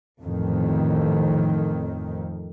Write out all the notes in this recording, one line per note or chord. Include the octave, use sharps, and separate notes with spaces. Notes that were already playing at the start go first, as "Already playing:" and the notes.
A1 F2 D#3